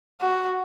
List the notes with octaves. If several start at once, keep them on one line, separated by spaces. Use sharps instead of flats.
F#4